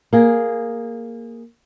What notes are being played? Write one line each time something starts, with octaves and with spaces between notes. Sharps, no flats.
A#3 G#4